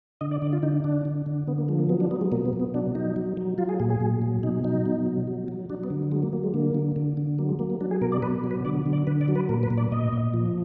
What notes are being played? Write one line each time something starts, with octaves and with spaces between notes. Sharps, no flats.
D3 D#5
D5
D3 D5
F4
D3 D#4
D3 D4
D3
D3
D3 B3
A#3
F3 G#3
A#3
F#3 B3
D4
F#3 B3
G#3
B2 A#3
B3
B2
B3
F#3 D4
F#3 D#4
F#3
F#3
F#3 F4
G#4
A#2 G#4
G#4
A#2
F#3
B2 D#4
F#3 D#4
B2
F#3
F#3
F#3
F#3 D4
B3
D3
F#3 G#3
A#3
F#3 A#3
G#3
D3 A#3
D3
D3
D3
F#3 A#3
G#3
F#3 A#3
A#3
F#3 D4
G#4
B2 A#4
D5
B2 B4
F#3
B4
D3 D5
D3
D5
D3 B4
D5
F#3
B4
A#2 A#4
B4
A#2
D5
A#2 D#5
A#2
F3